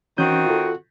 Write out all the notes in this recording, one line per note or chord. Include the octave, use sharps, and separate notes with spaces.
D#3 E3 C4 C#4 F#4 G6
F4 A4